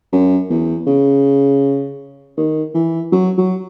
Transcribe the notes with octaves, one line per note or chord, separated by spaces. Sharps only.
F#2
E2
C#3
D#3
E3
F#3
F#3